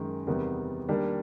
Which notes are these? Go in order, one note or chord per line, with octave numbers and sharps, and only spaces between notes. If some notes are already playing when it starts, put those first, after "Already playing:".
Already playing: F#2 D#3 G#3
E2 C3 D#3 G3 B3
D#3 G3 A#3 D4